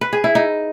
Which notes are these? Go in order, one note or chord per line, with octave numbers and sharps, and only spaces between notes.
B4
G#4
E4
D#4